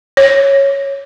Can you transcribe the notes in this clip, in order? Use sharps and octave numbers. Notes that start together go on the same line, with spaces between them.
C#5